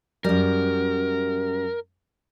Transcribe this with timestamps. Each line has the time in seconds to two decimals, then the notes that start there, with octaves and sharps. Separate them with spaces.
0.24 F#2 G3 A#4